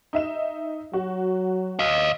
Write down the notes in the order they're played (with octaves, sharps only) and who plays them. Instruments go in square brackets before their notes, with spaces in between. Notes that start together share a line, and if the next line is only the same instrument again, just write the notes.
[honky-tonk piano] D#4 E5 E7
[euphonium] F#3 [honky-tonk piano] F#4
[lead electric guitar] D#5 F5